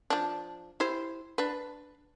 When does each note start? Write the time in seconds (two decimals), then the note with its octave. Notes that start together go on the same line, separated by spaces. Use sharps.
0.10 F3 D4
0.80 E4 G4 C5
1.38 D4 B4